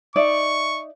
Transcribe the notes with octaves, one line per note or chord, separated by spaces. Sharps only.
D#4 D5 E5 C#6